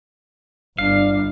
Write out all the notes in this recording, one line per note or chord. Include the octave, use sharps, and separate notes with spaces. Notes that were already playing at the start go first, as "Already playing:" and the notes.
G1 D4 F5